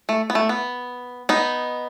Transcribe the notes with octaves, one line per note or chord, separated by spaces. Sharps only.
A3
B3
A3
B3
B3 D#4